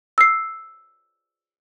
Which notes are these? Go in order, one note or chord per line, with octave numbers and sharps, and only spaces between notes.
E6 C7